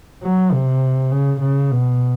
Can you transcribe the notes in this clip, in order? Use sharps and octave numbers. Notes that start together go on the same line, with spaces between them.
F#3
C3
C#3
C#3
B2